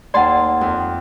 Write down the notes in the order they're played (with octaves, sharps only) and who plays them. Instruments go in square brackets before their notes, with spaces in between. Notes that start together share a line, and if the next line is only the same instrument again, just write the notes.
[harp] D#2 A5 C6 [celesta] D5 F#5
[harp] F2